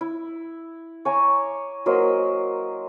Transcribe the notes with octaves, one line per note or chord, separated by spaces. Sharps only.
E4
C#5 G#5 A#5 D6
F#3 A#3 C5 D#5